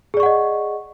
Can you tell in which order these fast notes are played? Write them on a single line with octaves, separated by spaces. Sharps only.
G#4 D5 C#6 F#5 D#5